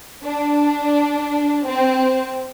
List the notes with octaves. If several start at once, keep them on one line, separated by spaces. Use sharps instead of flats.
D4
C4